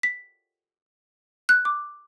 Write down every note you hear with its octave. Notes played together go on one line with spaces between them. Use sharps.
B6
F#6
D6